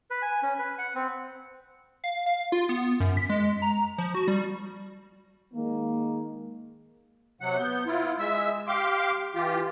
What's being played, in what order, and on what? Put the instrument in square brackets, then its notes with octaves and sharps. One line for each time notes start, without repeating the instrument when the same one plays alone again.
[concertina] B4
G#5
C#4
B4
F#5
C4
[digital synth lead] F5
F5
F4
B3
F#2
B6
G#3
A#5
F3
F#4
G3
[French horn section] D#3 G#3 A#3
[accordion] C3 F#3 F#5
B3 G6
E4 F4
G#3 E5 E6
G4 F5 C6 D6
E3 F4 G4